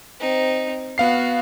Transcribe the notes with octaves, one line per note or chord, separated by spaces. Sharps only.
C4 D#4
B3 F#4 F5 C7